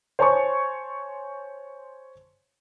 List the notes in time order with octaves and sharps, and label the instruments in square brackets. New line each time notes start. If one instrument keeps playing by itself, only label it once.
[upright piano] C5 C#5 G#5 A5 C6 C#6